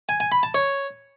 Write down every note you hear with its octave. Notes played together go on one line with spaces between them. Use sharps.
G#5
G#5
B5
A5
C#5